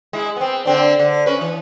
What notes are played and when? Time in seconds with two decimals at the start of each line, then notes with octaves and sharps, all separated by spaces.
0.13 G#3 E4
0.36 B3 C4
0.65 D3 C4 D4
0.99 D3
1.26 C#4 B4
1.41 E3